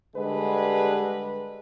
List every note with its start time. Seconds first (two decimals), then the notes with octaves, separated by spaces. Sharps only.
0.15 D3 G3 G#3 B4